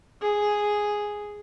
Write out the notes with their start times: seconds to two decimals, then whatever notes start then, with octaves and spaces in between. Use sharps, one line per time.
0.22 G#4